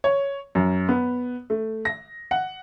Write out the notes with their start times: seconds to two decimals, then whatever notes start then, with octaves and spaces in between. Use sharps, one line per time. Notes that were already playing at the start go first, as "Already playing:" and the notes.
0.04 C#5
0.55 F#2
0.89 B3
1.50 A3
1.85 A#6
2.31 F#5